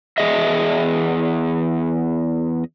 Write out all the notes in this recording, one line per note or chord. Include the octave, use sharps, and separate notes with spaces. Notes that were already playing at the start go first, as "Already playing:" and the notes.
E2 G#4 D#5 E5